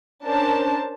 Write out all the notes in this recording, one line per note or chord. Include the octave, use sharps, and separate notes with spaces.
C#4 D4 A#4 C5 A5